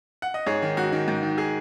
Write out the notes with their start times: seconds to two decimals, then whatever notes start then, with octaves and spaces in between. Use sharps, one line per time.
0.22 F#5
0.34 D#5
0.47 G#2 G#4 C#5
0.62 D#3
0.77 G#2 F#4
0.92 D#3
1.08 G#2
1.23 D#3
1.38 G#4